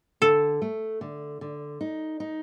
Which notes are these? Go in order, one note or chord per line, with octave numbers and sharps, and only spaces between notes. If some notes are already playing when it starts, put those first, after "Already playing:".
D3 A4
A3
D3
D3
D#4
D#4